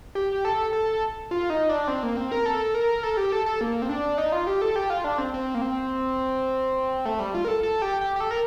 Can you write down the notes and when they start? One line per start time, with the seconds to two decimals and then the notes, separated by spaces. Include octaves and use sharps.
0.15 G4
0.45 A4
0.73 A4
1.31 F4
1.50 D#4
1.69 D4
1.88 C4
2.03 A#3
2.17 C4
2.32 A#4
2.46 A4
2.75 A#4
3.03 A4
3.17 G4
3.32 A4
3.46 A4
3.61 A#3
3.82 C4
3.89 D4
4.18 D#4
4.32 F4
4.47 G4
4.62 A4
4.76 G4
4.90 F4
5.04 D4
5.18 C4
5.34 C4
5.55 A#3
5.62 C4
7.05 A3
7.20 G3
7.34 F4
7.45 A#4
7.48 A4
7.63 A4
7.82 G4
8.01 G4
8.16 G4
8.20 A4
8.31 A#4